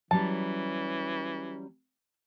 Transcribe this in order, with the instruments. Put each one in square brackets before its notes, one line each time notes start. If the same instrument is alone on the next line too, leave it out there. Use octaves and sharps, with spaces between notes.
[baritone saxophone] E3 [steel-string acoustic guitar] F#3 G3 C#4 [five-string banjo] A5